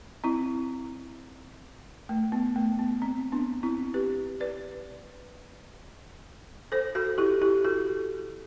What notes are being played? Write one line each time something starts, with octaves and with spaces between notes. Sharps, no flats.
C4 E4
A3
B3
A3
B3
C4
B3 D4
C4 E4
G4 B4
B4 D5
A4 C5
F#4 A4
E4 G4
E4 G4
F#4 A4